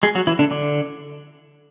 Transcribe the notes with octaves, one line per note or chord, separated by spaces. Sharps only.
G#3 G#4
F#3 F#4
E3 E4
D3 D4
D3 D4